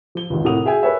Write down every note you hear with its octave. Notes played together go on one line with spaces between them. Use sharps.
F3 G7
G#1 C#2
A2 C3 A#4 F#5 D#6 F7
F#4 G#4 E5 G5 G#5
A#4 B4 C#5 E5